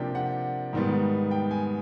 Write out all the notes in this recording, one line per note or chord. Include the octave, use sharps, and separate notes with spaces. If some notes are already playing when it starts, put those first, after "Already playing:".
Already playing: C3 F3 A#3 D4 G5
F#5
G#2 D#3 G3 B3
G5
G#5